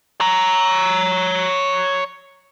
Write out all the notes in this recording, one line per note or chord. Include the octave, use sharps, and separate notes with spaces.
C#5 A#5